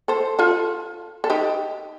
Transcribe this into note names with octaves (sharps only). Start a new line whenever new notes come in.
A4 C5
F4 A4
A4
D#4 G4